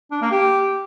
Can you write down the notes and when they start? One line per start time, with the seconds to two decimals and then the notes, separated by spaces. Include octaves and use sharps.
0.11 D4
0.21 A#3
0.31 G4